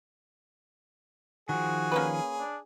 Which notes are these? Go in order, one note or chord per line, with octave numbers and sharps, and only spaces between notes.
D#3 F3 F#4 G#4
A#3 C#4 B4
D4